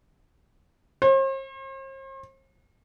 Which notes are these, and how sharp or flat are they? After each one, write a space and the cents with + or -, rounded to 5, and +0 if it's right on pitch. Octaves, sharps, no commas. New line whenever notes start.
C5 +45